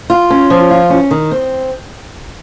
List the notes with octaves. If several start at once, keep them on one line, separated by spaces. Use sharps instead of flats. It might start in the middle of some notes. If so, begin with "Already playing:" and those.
F4
C#4
F3
F4
C#4
D#3
C4